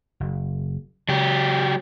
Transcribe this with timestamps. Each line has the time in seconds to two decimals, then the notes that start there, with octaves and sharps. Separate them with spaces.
0.20 F#1
1.09 C#3 F#3 G4